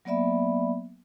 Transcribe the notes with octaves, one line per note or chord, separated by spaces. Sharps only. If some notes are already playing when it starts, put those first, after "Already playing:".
F#3 A#3 B3 D5 E5 B5